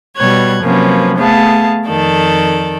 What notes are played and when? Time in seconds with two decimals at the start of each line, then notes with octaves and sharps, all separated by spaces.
0.16 B2 G3 C#5 F#6 G#6
0.61 C3 F3 F#3 A#3 C#4 B4
1.17 A3 B3 G#4 F5 A5
1.86 F2 D#3 A4 D5